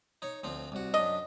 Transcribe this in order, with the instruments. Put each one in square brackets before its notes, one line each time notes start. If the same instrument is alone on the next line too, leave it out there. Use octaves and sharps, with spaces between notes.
[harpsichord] D#4 C#5
D2 F3 C4
C2 F#4
[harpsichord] F#2 D4 [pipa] D#5